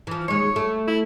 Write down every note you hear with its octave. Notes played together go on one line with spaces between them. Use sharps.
E3 F3
D#2 G#3 C#5
A3
E4